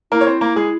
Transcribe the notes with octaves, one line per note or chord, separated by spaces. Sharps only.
A#3 E4 A#4
C#5
C4 C5
A#3 A#4
G#3 G#4